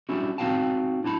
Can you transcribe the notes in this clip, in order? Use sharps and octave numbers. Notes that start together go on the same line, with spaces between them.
G3 C#4 D4 E4 F#4
C4 D#4 F#4 F5 G5 A5
D4 E4 A5 B5